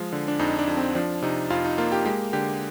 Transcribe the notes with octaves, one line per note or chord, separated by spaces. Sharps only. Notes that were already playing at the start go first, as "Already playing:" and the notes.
Already playing: F3 G#3
D3
D4
F2 D#4
D4
F2
C4
F3 D4
C3 D#4
F2 F4
D#4
A#3 F4
G4
G#3 G4
D3 G4